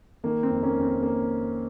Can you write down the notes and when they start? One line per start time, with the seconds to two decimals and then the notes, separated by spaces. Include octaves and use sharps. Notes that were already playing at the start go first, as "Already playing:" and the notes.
0.24 D#3 A#3
0.43 C4
0.50 F2
0.63 A#3 C#4
0.77 F2
0.83 C4
1.02 A#3